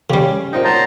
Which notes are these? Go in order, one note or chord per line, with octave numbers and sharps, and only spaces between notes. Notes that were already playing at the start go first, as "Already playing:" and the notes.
C#3 G3 C#4 G4
A#2 C4 D#4 D#5 G5
F#3 C5 A5 A#5